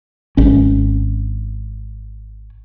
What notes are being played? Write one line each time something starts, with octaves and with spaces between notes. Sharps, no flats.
G#1 C#4